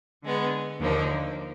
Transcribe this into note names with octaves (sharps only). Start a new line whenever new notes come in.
D3 G#3 B3
D#2 D3 F3 A#3 D#4